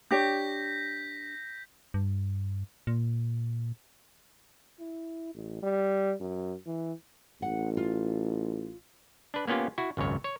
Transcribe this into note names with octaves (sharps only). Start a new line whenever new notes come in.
D4 G4 C#5 G6 A#6 B6
G2
A#2
E4
A1
G3
F#2
E3
A1 F#5
F4
D4 B4
A#3 B3 C#4 F4 G4
E4 F#4
G#1 C#2 F#2 C#5
C#5